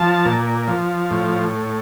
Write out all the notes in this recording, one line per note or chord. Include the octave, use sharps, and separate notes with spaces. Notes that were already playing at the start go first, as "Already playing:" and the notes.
Already playing: F3 A5
A#2
F3
A2